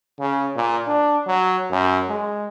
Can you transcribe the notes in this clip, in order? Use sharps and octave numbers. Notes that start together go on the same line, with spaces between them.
C#3
A#2
D4
F#3
F#2
G#3